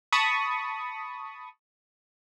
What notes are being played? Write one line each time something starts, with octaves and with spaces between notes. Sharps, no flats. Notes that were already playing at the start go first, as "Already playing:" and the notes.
A5 B5 C#6 D#6